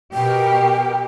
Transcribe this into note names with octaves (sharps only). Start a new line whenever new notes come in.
B2 G4 A#4 G5